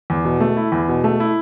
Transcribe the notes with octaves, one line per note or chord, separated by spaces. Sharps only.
E2
B2
A3
E4
E2
B2
A3
E4